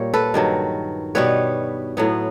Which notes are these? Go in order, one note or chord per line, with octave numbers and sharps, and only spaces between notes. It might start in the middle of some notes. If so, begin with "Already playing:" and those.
Already playing: A#2 G3 A#3 C#5
A4 B4
G2 D#3 F#3
B2 G3 B3 B4 C#5
A2 F#3 B3